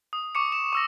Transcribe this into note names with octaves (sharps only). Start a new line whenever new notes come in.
D#6
C#6 D6 C#7
E7
C#6 E6 A#6